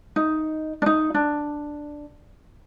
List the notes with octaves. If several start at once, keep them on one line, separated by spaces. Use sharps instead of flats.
D#4
D4 D#4
D4